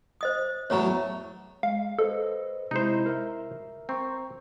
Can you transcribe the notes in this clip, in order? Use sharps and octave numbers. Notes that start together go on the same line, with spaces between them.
C5 D#5 D#6
E2 A2 F#3 C#5 A#5
G#3 F5
A4 B4 C5 D#5
C3 G#3 D#4 E4 C5
A#4 E5
C4 A#5 C#6